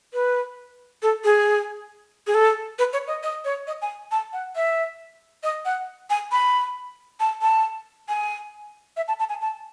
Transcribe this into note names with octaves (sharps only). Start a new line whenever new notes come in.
B4
A4
G#4
G#4
A4
B4
C#5
D#5
D#5
C#5
D#5
G#5
A5
F#5
E5
D#5
F#5
G#5
B5
A5
A5
G#5
E5
A5
A5
G#5
A5